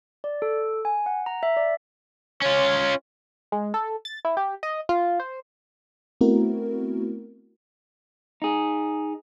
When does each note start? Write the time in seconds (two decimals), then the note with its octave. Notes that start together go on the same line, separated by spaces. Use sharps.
0.24 D5
0.42 A4
0.85 G#5
1.06 F#5
1.26 A#5
1.43 E5
1.57 D5
2.42 C#4 F4 C#5
3.52 G#3
3.74 A4
4.05 A6
4.25 E4
4.37 G4
4.63 D#5
4.89 F4
5.20 C5
6.21 A3 B3 C4 E4 F#4 A#4
8.42 D#4 G#4